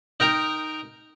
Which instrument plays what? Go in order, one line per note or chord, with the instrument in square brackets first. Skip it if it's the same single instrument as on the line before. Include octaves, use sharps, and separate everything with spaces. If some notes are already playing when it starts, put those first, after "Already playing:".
[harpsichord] D#4 A#4 G5 A#5